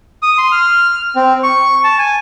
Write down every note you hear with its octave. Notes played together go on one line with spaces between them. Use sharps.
D#6
C6
F6
C4
C#6
A5
G#5